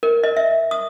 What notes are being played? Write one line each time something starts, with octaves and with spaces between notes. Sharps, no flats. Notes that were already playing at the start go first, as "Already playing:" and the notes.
A#4
D#5
E5
D#6